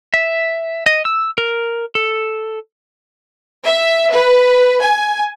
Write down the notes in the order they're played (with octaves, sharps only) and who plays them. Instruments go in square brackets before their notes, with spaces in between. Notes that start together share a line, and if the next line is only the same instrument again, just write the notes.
[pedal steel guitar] E5
D#5
E6
A#4
A4
[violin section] E5
B4
G#5